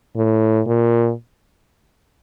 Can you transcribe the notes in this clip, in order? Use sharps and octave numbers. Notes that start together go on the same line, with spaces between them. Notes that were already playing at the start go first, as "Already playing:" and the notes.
A2
A#2